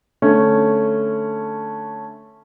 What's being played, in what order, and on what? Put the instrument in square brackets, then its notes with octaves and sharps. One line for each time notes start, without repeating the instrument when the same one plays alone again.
[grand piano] D3 A3 C#4